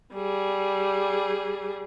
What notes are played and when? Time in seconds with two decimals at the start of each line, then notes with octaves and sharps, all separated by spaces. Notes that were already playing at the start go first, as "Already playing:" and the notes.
0.14 G3 G#4